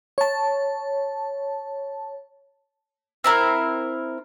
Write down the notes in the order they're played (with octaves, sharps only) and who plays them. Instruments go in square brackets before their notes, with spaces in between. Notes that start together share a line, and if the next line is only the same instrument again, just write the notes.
[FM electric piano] C#5 A5
[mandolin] C4 E4 A#4